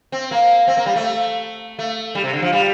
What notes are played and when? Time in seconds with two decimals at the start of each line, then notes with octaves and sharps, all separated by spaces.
0.12 C4
0.31 A#3
0.68 C4
0.77 A#3
0.86 G3
0.96 A3
1.79 A3
2.15 G3
2.24 C3
2.33 D3
2.42 F3
2.52 G3